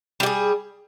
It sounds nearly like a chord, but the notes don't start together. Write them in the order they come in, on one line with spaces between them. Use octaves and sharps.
G3 G4 G#4